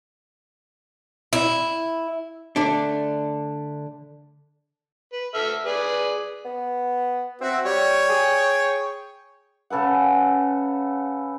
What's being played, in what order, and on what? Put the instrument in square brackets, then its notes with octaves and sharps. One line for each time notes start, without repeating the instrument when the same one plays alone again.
[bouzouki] E4
[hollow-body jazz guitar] D3 A3 D4
[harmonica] B4
A4 E5 F6
G#4 B4 D5
[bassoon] B3
[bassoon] C4 [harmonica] F#4 E5
[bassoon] G3 [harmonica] C#5 G5 C#6
[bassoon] G#4
[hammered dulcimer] C#3 A4 B4 F#5